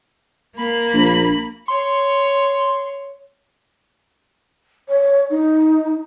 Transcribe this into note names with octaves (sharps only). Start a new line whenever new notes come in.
A#3 B5
A#1
C#5 C6
C#5
D#4